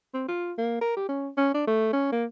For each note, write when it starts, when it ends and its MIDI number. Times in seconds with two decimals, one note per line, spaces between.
0.14 0.24 60
0.29 0.53 65
0.58 0.81 58
0.81 0.96 70
0.97 1.08 67
1.09 1.29 61
1.37 1.50 61
1.54 1.66 62
1.67 1.91 57
1.93 2.08 61
2.12 2.26 58